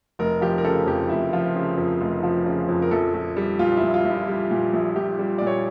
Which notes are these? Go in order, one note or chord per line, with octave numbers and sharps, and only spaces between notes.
F1 A#4
F3 G4
A#4
C#3 A4
F2 G4
F1 E4
F3 F4
C#3
F2
F1
F3
C#3
F2
A#4
A#1 A4
A#1
G3
A#2 F4
A#1 E4
F4
A#1
E4
G3
A#2
A#1
A#1 G4
G3
A#2 D5
C#5